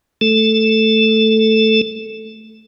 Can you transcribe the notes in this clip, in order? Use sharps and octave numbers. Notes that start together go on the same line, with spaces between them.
A3 A4